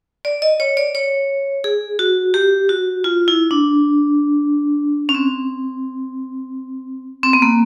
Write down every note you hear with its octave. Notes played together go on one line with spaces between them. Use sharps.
D5
D#5
C#5
D5
C#5
G#4
F#4
G4
F#4
F4
E4
D4
C#4
C4
C4
B3
A#3